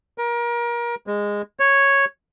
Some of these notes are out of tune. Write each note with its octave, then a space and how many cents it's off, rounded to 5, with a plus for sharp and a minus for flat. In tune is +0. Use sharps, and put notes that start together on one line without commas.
A#4 +30
G#3 -15
C#5 -5